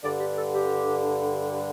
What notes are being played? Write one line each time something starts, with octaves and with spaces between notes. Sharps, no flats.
G2 D3 D5
G4
A4
G4